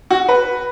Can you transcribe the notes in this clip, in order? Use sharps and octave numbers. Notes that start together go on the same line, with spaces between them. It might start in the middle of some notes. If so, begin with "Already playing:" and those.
F#4
B4